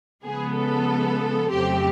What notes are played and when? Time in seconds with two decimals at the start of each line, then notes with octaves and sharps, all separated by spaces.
0.25 C#3 F3 G#3 B3 G#4
0.56 A4
1.51 F2 C#3 F#3 A3 C4 G4